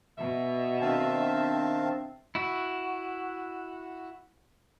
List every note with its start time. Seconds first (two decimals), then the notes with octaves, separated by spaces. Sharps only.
0.18 B2 E5
0.82 D#3 C4 D4 F5 A5
2.35 E4 F#4